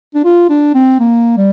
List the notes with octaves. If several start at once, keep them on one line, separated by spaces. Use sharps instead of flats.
D4
F4
D4
C4
A#3
G3